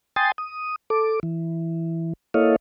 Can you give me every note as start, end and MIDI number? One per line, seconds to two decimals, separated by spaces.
0.16 0.32 79
0.16 0.32 80
0.16 0.32 84
0.16 0.32 87
0.16 0.32 93
0.38 0.76 87
0.90 1.20 69
0.90 1.20 86
1.23 2.13 52
2.34 2.56 58
2.34 2.56 64
2.34 2.56 69
2.34 2.56 73
2.34 2.56 75
2.34 2.56 77